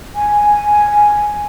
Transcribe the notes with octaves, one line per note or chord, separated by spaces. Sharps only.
G#5